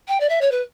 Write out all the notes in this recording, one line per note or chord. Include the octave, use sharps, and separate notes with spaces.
G5
D5
E5
C#5
B4